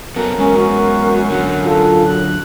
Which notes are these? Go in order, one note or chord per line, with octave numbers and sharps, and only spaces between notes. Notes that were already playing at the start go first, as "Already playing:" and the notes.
F#2 B3 A4 A#4
G#3 B3 C#4
F#4
D3 F#3 F#5
F4 A4
F#6